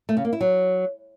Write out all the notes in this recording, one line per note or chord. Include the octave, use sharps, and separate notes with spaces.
A3
C#3
A#3
E4
F#3